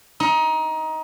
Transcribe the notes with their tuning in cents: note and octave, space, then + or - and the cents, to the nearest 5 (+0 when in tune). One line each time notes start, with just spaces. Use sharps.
D#4 +20